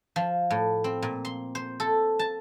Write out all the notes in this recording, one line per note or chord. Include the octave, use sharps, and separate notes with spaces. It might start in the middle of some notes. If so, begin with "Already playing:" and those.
F3
A2
C4
A#2
C6
C5
A4
A5